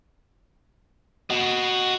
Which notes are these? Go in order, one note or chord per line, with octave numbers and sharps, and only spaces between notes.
F#4 D#5